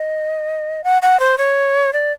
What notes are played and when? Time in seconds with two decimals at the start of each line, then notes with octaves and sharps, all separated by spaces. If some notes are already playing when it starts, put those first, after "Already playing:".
Already playing: D#5
0.84 F#5
1.02 F#5
1.20 C5
1.38 C#5
1.93 D5